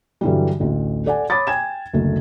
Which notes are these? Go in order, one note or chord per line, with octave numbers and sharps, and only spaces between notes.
G2 D3 E3 F#3 G3
A1 D2
A4 D5 F#5 G#5
C#5 B5 D6 D#6 A6
G5 G#5 G#6 E7
F#1 D2 A3